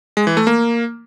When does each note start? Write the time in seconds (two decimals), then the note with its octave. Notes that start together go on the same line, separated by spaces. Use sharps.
0.17 G#3
0.27 E3
0.37 A3
0.47 A#3